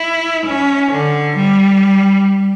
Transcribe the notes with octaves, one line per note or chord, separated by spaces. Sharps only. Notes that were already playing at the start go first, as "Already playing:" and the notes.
Already playing: E4
C#4
D3
G3